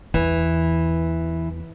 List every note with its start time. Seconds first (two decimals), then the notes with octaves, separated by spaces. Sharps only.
0.14 E2 E3